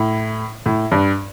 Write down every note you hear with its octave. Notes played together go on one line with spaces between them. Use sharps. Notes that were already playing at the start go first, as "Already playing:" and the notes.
Already playing: A2
A2
G2